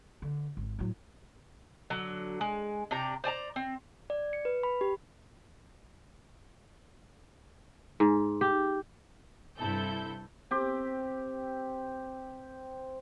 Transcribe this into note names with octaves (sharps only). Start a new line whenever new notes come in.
D3
G#1
A2 F#3
D3 F#3
G#3
C3 D4 G4 A#5
C5 D5 G#5 A#5
C4
D5
C#7
B4
B5
G4
G#2
G4
G2 C3 E4 A4 G6
C4 G4